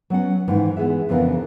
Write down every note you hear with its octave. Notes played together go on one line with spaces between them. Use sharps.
F#3 B3 C#4 F#5
G#2 D#3 E3 A#3
E3 B3 G#4 E5
F2 C#3 E3 B3 D4 A#4